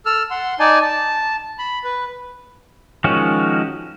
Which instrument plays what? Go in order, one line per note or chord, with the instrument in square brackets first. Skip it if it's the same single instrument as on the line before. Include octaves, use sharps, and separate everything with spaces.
[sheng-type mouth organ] A4 E6 F6
F#5 C6
D#4 D5 G#5 A5
A5
B5
B4
[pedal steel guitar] D#3 F3 G#3 C#4 F#4